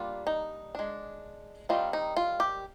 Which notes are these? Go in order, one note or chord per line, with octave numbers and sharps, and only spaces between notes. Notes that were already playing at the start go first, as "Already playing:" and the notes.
Already playing: G3 A#3 D4 F4
D#4
G#3 D4
D#3 G3 C4 D#4 F4
D#4
F4
G4